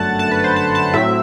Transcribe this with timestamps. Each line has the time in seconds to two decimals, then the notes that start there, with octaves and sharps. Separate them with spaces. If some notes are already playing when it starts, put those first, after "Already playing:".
Already playing: G1 F#2 D3 A3 F#5 A5
0.19 A5
0.31 B4
0.44 C5
0.56 A5
0.75 A5
0.94 A2 F#3 C4 E5